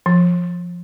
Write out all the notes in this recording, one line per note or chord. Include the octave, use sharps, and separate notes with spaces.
F3